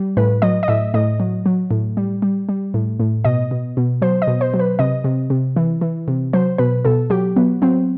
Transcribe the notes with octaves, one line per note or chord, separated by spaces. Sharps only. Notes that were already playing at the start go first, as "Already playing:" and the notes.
Already playing: G3
A2 B4
F#3 D#5
D#5
A2 E5
A2 D#5
F#3
F#3
A2
G3
G3
G3
A2
A2
B2 D#5
B2
B2
F#3 C5
D#5
B2
C5
F#3
B4
C3 D#5
C3
C3
E3
E3
C3
F#3 C5
B2 B4
B2 A4
F#3 G4
F#3 B3
F#3 C4